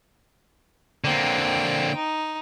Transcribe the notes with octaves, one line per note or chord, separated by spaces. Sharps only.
D3 A#3 C4 G5
D#4